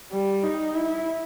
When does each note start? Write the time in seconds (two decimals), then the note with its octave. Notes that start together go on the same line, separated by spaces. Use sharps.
0.12 G3
0.43 D#4
0.75 E4